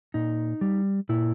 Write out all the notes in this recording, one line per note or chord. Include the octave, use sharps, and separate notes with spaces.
A#2 D#4
G3
A#2 E4